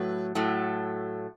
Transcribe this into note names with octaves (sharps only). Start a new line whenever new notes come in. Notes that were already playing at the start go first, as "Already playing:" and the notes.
Already playing: A2 F#3 A3 B4
A2 F#3 A3